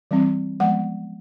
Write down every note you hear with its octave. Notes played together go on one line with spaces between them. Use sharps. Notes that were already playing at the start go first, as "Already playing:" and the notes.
E3 G3 C4
F3 G#3 B3 F#5